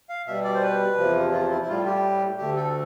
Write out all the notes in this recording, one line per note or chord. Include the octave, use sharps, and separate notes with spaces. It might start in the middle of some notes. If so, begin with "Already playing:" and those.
F5
B2 G3 E5
D5
C5
B4
E2 C3 F3
F4
E4
E4
A2 G3 F4
G4
D2 D3 A3 G4
A4